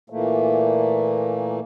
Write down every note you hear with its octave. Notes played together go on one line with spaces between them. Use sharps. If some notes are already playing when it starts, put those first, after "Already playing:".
A#2 E3 A3 A#3